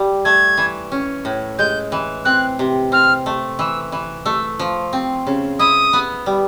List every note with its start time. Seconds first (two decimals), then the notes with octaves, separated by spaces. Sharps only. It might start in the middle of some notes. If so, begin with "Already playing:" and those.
Already playing: G3
0.25 A3 G#6
0.57 E3
0.92 C#4
1.25 A2
1.58 G#3 G6
1.92 E3
2.25 C4 F#6
2.59 C3
2.92 C4 F6
3.26 A3
3.59 E3 E6
3.92 E3
4.25 A3 E6
4.59 F3
4.93 C4
5.27 C#3
5.59 E4 D#6
5.93 B3
6.26 G3